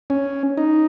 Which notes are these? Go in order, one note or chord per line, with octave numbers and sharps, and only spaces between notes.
C#4
D#4